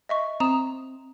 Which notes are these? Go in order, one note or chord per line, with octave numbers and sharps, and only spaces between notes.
D#5 E5 C#6
C4 A#5 D#6 E7